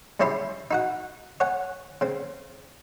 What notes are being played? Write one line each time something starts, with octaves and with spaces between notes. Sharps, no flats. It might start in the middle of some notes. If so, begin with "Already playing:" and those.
G2 C#3 C#4 E4 G4 C6
D#4 F#4 F#5
C#5 F#5 G#5
C#3 C4